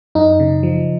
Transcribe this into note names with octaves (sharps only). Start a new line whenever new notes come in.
F#2 D#4
C#3
F3